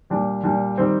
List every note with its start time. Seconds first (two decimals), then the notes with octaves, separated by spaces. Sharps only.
0.10 A#2 G3 D4
0.44 A#2 G3 D4
0.78 D#3 G3 C4